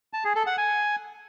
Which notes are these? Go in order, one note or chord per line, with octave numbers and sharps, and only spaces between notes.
A5
G#4
A4
F#5
G#5